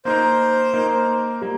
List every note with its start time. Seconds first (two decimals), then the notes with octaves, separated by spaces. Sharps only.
0.05 A#3 D#4 A#4 C5
0.74 A#3 D#4 A#4
1.42 G3 A#3